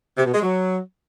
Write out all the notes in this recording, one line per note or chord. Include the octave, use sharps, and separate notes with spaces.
C3
B2
G#3
F#3